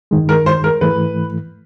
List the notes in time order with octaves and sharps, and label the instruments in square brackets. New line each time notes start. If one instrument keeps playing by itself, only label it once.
[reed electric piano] G2 D#3 G#3
[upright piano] A#4
C5
A#4
[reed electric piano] G#2 E3 A3 [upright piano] B4